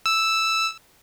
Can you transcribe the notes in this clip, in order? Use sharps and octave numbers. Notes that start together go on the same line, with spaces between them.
E6